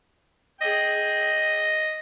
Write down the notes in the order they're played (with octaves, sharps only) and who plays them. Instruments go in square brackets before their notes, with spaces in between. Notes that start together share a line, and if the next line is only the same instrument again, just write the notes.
[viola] G#4 G5 [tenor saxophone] D#5